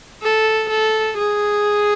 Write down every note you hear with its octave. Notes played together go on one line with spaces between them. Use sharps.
A4
A4
G#4